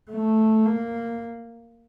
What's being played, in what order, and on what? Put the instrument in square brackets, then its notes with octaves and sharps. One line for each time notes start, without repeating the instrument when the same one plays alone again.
[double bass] A3
A#3